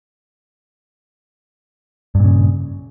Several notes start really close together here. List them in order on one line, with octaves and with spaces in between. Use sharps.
G2 A#2 C#3